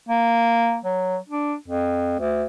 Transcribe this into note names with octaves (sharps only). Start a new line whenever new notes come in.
A#3
F#3
D4
F2
D2